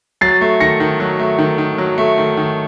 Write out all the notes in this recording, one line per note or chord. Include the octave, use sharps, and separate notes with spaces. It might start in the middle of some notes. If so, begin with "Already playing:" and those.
F#3 A6 C7
A3
D#3 A#6 C#7
D#3
F#3
A3
D#3
D#3
F#3
A3
D#3
D#3